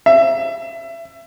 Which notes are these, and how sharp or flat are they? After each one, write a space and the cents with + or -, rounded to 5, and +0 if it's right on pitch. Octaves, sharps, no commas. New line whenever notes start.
E5 +25